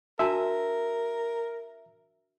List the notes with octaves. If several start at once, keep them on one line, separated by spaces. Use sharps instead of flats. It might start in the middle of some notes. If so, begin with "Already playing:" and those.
D4 F#4 A#4 E5 A5